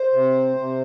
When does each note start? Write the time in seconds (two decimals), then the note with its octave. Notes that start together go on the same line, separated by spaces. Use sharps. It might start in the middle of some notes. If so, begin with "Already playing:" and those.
Already playing: C5
0.13 C3
0.57 C3